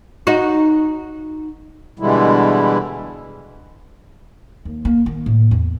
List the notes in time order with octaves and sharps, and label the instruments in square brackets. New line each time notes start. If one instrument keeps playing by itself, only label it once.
[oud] D#4 F#4
[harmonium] B2 D3 E3 G3 G#3 E4
[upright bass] D#2
A#3
D#3
A2
E2